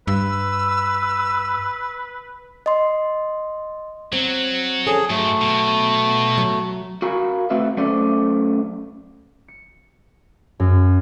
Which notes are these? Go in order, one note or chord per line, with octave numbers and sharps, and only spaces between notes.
G2 B4 E6
D#5 C6
F#3 C4
C#4 G#4 A4
G#2 F#3 A3
B2
F#3
F#4 A#4 F5 G#5 A#5 B5
A3 C4 F#4 B4 E5
F#3 A3 C#4 A4 C5 D5
C#7
F#2